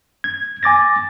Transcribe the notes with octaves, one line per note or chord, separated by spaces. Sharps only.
G#6
G#5 D6 A6 A#6